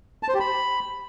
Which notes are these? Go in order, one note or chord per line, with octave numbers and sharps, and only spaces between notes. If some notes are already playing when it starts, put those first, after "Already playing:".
A5
C5
G4
B5